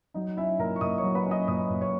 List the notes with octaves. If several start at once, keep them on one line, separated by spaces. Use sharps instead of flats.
F#3 D#4 D#5
C#4 E4 E5
A#2 A#4 A#5
C#6
A#2 D#5 D#6
C#5 C#6
F#3
B4 B5
C#4
D#5 D#6
A#2 D#5 D#6
A#2
C#5 C#6